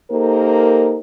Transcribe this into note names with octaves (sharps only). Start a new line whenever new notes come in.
A#3 D#4 G4 A4 A#4 C5